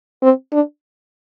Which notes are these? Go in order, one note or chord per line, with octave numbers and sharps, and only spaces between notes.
C4
D4